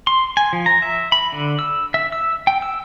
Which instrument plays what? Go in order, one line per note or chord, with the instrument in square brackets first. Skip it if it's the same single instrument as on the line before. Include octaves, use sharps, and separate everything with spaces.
[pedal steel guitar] C6
G#5
F3
A#5
E5
B5
D3
E6
E5
E6
G5
E6